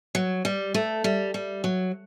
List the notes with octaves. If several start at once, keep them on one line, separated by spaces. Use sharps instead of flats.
F#3
G3
A3
G3
G3
F#3